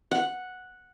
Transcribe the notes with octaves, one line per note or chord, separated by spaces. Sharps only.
F#5